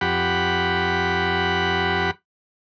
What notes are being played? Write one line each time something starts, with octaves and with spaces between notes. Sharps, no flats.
F2 G4 F#5 B5